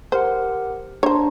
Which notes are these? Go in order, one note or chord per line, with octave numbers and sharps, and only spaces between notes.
G4 A#4 C5 F#5
D4 C5 C#5 A#5